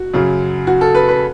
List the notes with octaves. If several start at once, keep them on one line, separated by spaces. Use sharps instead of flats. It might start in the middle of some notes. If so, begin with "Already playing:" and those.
Already playing: F#4
F#2 C#3 F#3
F#4
A4
B4
B4